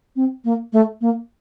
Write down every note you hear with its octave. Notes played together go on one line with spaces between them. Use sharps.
C4
A#3
A3
A#3